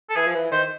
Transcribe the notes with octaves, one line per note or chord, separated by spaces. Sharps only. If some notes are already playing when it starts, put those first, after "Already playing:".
A4
E3 G#4
F3
E3
D#3 C5